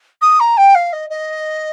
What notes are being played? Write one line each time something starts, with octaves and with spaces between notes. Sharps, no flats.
D#6
A#5
G5
F5
D#5
D#5